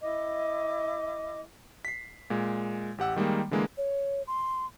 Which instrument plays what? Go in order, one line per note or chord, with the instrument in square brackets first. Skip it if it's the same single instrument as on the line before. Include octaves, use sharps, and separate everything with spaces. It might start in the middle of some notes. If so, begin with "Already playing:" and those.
[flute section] E4 D#5 D6
[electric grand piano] B6 C7
A#2 G#3
A1 G4 F#5 E6
D#3 G3 G#3 A#3
D3 E3 G#3 A#3
[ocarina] C#5
C6